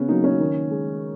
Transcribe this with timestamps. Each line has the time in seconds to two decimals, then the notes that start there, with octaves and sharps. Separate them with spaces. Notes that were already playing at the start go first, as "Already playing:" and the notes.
Already playing: C#3 B3 C#4
0.08 F#3 A#3 D#4
0.24 C#4
0.40 D#3
0.71 G#3